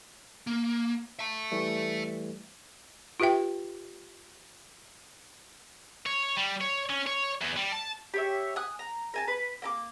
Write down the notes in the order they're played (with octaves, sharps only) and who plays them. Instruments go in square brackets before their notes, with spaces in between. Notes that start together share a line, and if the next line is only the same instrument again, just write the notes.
[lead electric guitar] A#3
E5 A5
[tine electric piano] E3 G3 A3
[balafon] F4 G4 B4 E5 G5
[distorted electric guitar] C#5
G3
C#5
C#4
C#5
E2
G3
A5
[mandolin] G4 C#5 E5
G#5 D#6 F#6
A#5
A#4 G#5 A5
B4
A#3 A#5 D6